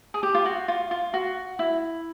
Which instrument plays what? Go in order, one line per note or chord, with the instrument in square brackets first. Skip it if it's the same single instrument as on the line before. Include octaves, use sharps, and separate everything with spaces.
[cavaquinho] G#4
G4
F4
F#4
F4
F4
F#4
E4